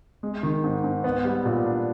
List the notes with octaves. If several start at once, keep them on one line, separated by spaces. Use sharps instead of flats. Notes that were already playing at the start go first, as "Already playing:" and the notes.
G#3
D#3
G#2
G#2
B3
G3
A#2
D4